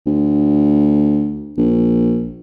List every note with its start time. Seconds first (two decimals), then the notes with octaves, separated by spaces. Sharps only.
0.07 D2
1.58 A#1